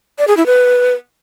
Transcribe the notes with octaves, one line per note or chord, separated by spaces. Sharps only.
D5
G#4
E4
B4